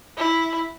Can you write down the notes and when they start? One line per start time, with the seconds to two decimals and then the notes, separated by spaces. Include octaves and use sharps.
0.17 E4